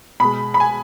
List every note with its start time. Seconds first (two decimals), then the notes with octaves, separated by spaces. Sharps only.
0.20 B2 G#3 B5
0.54 B5
0.60 G#5